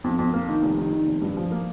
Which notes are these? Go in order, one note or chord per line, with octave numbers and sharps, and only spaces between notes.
F2
F2
A#3
D#3
F1
D#3
D#3
F1
G2
F3
A#3